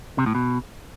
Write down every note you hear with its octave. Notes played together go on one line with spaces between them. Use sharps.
C3
A2
B2